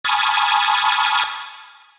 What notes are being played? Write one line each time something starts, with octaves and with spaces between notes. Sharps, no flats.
G#5 A5 B5 C#6 D#6 F6